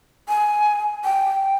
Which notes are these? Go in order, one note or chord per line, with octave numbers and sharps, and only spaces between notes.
G#5
G5